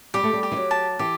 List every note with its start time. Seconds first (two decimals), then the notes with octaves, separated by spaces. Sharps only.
0.14 G3 G4
0.23 A3
0.33 G3
0.43 G4
0.52 E3
0.57 F#3
0.71 A5
0.99 E3 G4